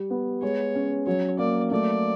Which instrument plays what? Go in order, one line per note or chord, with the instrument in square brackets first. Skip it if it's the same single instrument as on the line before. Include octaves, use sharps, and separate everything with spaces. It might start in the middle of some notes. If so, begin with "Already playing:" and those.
Already playing: [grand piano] G3
B3
[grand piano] G#3 [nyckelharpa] C#5
[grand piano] C#4
[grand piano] F#3 [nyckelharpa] C#5
[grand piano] A#3 [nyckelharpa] D5
[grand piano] A3 [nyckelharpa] D5